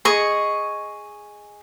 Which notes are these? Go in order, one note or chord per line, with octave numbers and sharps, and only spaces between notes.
G#4 D#5 C#6